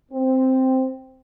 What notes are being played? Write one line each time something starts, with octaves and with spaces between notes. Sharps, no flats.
C4